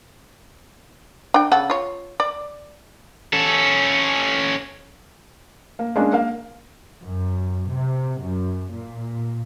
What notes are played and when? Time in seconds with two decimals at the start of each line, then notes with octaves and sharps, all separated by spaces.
1.34 D4 G5
1.52 C#3 A4 F#5
1.70 F4 C#5
2.20 D5
3.33 C#4 A4
5.79 A#3
5.96 G#3 A#3 C#4 D4
6.13 A#3 F5
7.03 F#2
7.70 C3
8.21 F#2
8.72 A#2